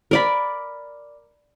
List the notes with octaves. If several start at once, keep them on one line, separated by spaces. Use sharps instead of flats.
A#4 D5 B5